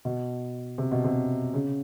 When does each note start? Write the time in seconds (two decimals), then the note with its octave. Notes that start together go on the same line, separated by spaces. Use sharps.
0.05 B2
0.78 C3
0.91 B2
1.04 C3
1.54 C#3